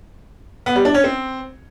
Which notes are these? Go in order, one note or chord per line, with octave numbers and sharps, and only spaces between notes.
B3
G3
D4
C#4
C4